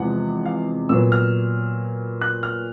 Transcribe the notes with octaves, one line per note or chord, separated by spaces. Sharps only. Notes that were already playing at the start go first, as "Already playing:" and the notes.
Already playing: E2 C3 F3 G#3 F#5
F5
A#2 F#3 B3 E6
F6
F#6
F6